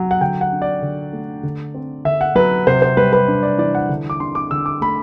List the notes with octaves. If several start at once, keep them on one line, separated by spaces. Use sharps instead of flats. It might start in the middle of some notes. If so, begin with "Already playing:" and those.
Already playing: F#3
F#5
D3 G5
F#5
D4
D5
D3
A3
D3
C4
D3 E5
F#5
F#3 B4
C3 C5
C5
G3 B4
B4
D4
D5
E3 D5
F#5
D3
D6
D4 C6
D6
D3 E6
D6
A3 B5